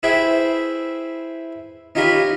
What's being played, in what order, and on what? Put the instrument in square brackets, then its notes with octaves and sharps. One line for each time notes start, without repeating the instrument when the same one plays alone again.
[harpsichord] E4 G#4 B4 C5 E5 G5
C#4 D#4 F4 G4 A#4 B5